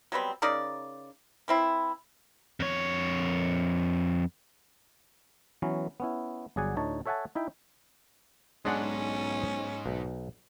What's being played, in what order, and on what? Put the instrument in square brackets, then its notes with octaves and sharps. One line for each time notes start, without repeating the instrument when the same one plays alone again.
[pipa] F#3 G3 B3 C4
C#3 D#4 A#4 D5
E3 C4 E4
[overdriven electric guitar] F2 C#5
[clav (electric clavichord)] E3 F#3 B3 C#4
B3 C#4 E4
G1 F#3 G#4 D5 F#5 G#5
D2 A2 D3 D#4 C#5 A5
A4 C#5 E5 F#5 G#5 A5
D#4 E4 E5 G5
[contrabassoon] B1 [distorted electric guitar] G#2 [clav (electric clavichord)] G#3 D4 F#5 [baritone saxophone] C#4
[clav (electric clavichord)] B1